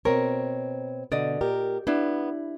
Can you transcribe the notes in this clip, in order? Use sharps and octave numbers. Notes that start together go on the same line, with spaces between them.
B2 C4 A#4 C#5
B2 D3 D5 D#5
A#2 G4 A#4
B3 D4 E4